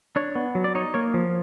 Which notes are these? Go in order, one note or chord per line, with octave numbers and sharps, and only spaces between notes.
D4 C#5
B3
F#3
D5
D#4 C#5
A#3 C#5
F3